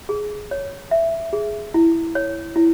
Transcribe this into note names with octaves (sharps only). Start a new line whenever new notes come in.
G#4
C#5
E5
G#4
E4
C#5
E4